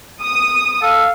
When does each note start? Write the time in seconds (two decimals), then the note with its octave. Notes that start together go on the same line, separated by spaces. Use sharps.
0.22 D#6
0.82 A4 F5